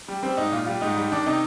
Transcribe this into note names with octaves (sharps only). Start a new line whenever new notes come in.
G3
G3 C4
G#2 D#4
A#2 F4
G3 F4
G#2 D#4
G3
D#3 D4
C3 D#4